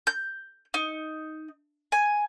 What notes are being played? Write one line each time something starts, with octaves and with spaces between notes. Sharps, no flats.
G6
D#4
G#5